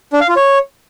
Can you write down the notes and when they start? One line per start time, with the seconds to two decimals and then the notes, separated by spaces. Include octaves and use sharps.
0.13 D4
0.21 F5
0.29 F4
0.36 C#5